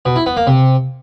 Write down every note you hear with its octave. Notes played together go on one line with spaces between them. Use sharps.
B2
E4
B3
A#3
C3